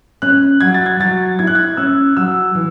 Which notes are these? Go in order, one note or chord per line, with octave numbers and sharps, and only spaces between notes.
C#4 F#6
F#3 G#6
A6
G#6
F#3 A6
E4 G#6
F#6
G#6
C#4 E6
F#3 E6
E3